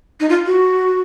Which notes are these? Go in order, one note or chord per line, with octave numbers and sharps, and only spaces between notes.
D#4
F4
F#4